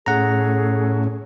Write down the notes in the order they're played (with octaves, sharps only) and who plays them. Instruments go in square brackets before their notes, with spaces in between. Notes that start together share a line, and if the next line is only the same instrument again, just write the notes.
[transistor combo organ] A2 C#4 [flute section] G#4 A4 [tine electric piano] F#5 A#5